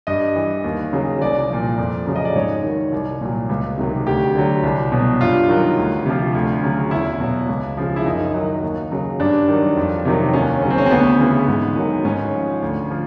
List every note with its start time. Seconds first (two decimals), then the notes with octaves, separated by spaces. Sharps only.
0.07 G2 D#5
0.36 E3
0.64 D#2
0.93 C#3 F#3
1.21 C2 D5
1.50 A#2 F3
1.78 F2
2.07 C#3 F#3
2.16 D#5
2.25 D5
2.35 G#2 C#5
2.63 D#3 F#3
2.92 C2
3.21 A#2 F#3
3.49 C#2
3.78 C3 D#3 F#3
4.06 D2 G4
4.35 D3 F#3
4.63 C2
4.92 B2 F#3
5.21 G2 F4
5.49 D#3 F#3
5.78 D2
6.06 C3 F3
6.35 D2
6.63 C#3 F#3
6.91 E2 E4
7.20 B2 F#3
7.49 C#2
7.77 C#3 F3
7.96 E4
8.05 F#2 D#4
8.34 D#3 F#3
8.63 D#2
8.92 C#3 F#3
9.20 G2 D4
9.48 D#3 F#3
9.77 F2
10.05 C3 D#3 F#3
10.33 D#2 C#4
10.62 C#3 F#3 C#4
10.70 C4
10.78 C#4
10.86 C4
10.91 D2 B3
11.19 C#3 E3
11.48 G#2
11.76 D#3 F#3
12.05 G#2 C#4
12.34 F3
12.62 D2
12.90 F3